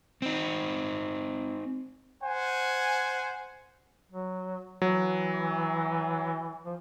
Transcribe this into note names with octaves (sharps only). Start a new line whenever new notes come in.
C4 D#4
C5 F#5 G#5
F#3
E3 F#3
F3